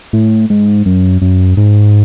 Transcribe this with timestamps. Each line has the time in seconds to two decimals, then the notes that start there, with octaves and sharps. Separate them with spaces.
0.13 A2
0.50 G#2
0.86 F#2
1.22 F#2
1.57 G#2